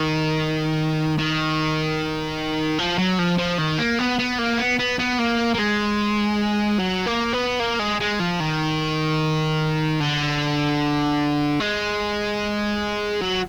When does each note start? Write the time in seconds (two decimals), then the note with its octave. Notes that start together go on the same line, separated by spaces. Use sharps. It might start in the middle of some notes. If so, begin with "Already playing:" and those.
Already playing: D#3
1.18 D#3
2.79 F3
2.98 F#3
3.19 F3
3.39 F3
3.59 D#3
3.79 A#3
3.99 B3
4.19 B3
4.39 A#3
4.59 B3
4.79 B3
5.00 B3
5.19 A#3
5.55 A#3
5.59 G#3
6.79 F#3
7.07 A#3
7.33 B3
7.60 A#3
7.79 G#3
8.00 G#3
8.20 F3
8.40 D#3
10.00 D3
11.60 G#3
13.21 F#3